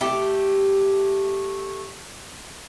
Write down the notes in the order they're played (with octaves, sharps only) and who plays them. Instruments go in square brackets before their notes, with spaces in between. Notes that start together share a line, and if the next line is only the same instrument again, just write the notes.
[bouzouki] A3 G4